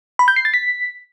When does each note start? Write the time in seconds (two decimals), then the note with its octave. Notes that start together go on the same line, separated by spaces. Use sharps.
0.19 B5
0.28 G6
0.36 C7
0.45 A6
0.54 B6